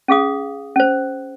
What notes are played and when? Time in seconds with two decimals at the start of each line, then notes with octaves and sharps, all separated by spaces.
0.08 C#4 G#4 F5 D#6
0.76 C#4 C5